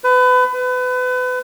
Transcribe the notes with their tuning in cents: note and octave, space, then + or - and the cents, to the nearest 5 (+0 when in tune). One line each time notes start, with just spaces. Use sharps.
B4 +30
B4 +30